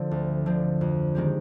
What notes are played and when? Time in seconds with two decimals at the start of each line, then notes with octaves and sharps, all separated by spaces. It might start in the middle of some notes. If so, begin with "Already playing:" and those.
Already playing: D3 F3 C4
0.11 D2
0.46 D3 F3 C4
0.81 F2
1.15 D#3 G#3 C4 G4